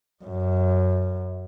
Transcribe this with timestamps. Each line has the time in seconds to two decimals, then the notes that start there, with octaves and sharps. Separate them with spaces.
0.24 F#2